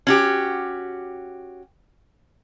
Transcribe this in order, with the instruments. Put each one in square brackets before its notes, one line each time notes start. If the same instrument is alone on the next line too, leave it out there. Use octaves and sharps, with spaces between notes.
[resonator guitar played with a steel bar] C#4 F#4 G4